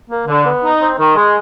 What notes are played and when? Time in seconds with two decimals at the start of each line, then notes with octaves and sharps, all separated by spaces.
0.10 A#3
0.27 D3
0.46 B3
0.63 D#4
0.81 C4
0.98 D#3
1.15 G#3